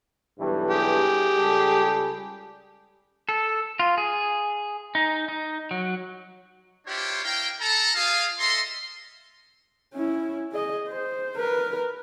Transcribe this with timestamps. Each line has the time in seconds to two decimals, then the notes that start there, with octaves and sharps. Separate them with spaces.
0.40 B1 G2 E3
0.71 G4 G#4
1.37 C#2 G3 A4
3.29 A4
3.79 F4
3.98 G#4
4.95 D#4
5.28 D#4
5.71 F#3
6.86 D4 E4 F4 G4 C5 C#5
7.23 E4 A#4 F5 G5
7.60 A4 A5 A#5
7.95 F4 G#4 F5
8.39 A4 D#5 E5 C6
9.94 C#4 E4
10.53 G#4 D#5
10.88 C5
11.37 A#4 B4